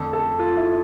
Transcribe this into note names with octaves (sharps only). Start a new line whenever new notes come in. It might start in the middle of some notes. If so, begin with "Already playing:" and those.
Already playing: F2 D3 A3 A4
A4
F4
E4